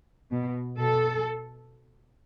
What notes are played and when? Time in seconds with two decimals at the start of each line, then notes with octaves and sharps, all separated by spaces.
0.32 B2
0.78 B2 A4